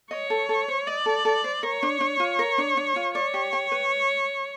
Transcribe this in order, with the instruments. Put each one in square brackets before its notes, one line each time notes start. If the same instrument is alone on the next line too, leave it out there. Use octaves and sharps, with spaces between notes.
[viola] C#5 [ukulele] D#5
[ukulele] A4
A4
C5
[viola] D5 [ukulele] D#5
[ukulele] A4
A4
C5
[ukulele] A#4 [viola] C#5
[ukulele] D4
D4
F4
A#4
D4
D4
F4
[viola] C#5 [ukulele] D5
[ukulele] G4
G5
B4